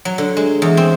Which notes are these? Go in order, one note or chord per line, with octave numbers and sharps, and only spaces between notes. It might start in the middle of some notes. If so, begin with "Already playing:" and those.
F#3
D3
G#3
E2
C4